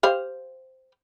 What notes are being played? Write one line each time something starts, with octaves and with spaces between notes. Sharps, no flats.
G4 C5 F5